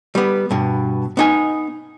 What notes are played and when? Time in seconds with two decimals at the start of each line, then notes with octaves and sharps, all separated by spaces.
0.15 G3 B3
0.51 G2 B2
1.17 B3 D#4 G#5